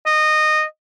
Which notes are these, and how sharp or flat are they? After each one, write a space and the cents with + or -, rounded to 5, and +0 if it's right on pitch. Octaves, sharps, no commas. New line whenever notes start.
D#5 -15